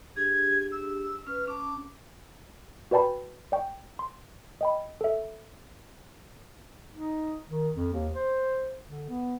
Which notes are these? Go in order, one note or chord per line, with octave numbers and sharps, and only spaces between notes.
D4 G4 G#4 G#6
E6
C#4 B4 F6
C#4 A5 D6
F#4 B4 D5 G5 A5 B5
D5 G5 C#6
C6
D#5 G5 B5
A4 E5
D#4
D#3
F2
D#2
C5
D3
B3